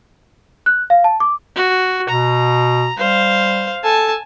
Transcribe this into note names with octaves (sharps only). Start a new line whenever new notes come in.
F#6
F5
A5
D6
F#4
B2 A#5
G3 C5 F5
A4 G#5 A5